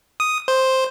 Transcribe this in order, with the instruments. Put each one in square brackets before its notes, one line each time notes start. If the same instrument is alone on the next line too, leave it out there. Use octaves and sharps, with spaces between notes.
[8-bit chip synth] D#6
C5